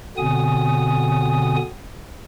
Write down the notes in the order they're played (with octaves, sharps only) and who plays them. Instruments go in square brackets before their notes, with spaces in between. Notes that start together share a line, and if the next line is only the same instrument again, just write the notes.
[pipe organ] B2 D3 B3 C4 G#5 D#6